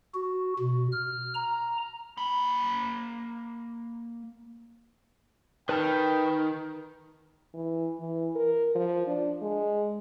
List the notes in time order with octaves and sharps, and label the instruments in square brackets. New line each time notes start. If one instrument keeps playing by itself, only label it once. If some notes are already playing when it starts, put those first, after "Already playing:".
[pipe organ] F#4
B2
F6
A#5
[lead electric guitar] A#3 B5
[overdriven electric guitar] D#3 [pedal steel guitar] B4 A5 F6 [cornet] G5
[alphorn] E3
E3
A#4
F3
D4
G#3